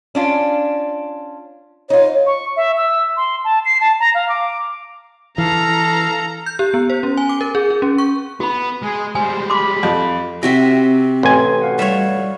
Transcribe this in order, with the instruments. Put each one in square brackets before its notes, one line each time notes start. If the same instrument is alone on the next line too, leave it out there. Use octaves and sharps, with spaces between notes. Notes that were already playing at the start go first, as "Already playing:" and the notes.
[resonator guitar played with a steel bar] C#4 D4 F4
[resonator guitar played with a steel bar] D#4 F4 [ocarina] C#5
[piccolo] C#6
E5
E6
C6
A5
C7
A5
A#5
F5
D6
[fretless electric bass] E3 [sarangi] A4 [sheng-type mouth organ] F5 [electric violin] A#5
[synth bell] G6
G4
B3
C5
C#4
G#5
D6
A#4
G#4
G#4
C#4
C#6
[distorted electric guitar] B3 [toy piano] F#4 B5
[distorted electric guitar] G#3 [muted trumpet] G#4
[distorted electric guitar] G3 G#3 [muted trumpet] C5 [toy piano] G#5
[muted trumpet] B5 [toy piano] C6 D6
[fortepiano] F2
[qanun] C3 F#4 E5 [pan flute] C4 [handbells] A#6 B6
[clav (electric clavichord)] A1 G#5 [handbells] C6
[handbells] F#4 F5 F#5
[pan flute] G3 [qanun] C#5 E5